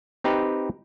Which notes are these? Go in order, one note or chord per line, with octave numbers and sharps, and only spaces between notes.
C4 D#4 G4 B4